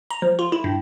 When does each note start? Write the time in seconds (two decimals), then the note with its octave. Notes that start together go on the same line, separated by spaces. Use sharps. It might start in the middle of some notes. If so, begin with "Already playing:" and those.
0.11 A#5
0.22 F3
0.39 F4
0.52 E4
0.64 G2